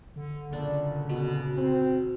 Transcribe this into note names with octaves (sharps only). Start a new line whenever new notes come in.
D3
F#2 A#2 C#3 D4
B2
C4